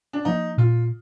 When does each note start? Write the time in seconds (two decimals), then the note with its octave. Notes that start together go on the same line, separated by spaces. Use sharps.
0.13 D4
0.25 F3 A#3 D#4
0.57 A#2 F4